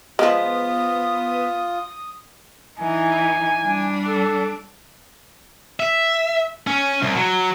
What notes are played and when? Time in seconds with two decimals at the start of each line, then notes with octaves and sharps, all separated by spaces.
0.19 F3 G#3 B3 F4 D#6
2.79 E3 D#4 G#5
3.64 G3 D4
4.08 A4
5.80 E5
6.67 C#4
7.02 C2
7.16 F#3